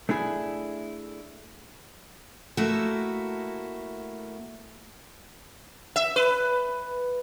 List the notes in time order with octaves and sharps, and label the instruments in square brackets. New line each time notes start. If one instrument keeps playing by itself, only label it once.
[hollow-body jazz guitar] A3 D4 E4 G#4
[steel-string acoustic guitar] A3 A#3 E4 F#4
[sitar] E5
B4